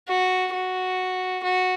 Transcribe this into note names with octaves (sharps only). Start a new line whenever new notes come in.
F#4
F#4
F#4